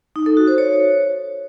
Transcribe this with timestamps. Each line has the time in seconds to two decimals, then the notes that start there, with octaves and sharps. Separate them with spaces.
0.16 D#4
0.26 A4
0.37 F#4
0.47 C5
0.58 C#5